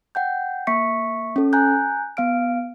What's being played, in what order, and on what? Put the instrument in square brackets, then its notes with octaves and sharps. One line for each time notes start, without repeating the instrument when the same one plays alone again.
[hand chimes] F#5 G5 G6
A#3 E5 C#6 B6 C#7
C#4 A4
G#5 A#5 F#6 G6
B3 F5 F6 D7